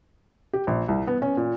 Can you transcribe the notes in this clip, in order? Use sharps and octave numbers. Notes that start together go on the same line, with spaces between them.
G4
A#1
C2
B3
C#4
A#2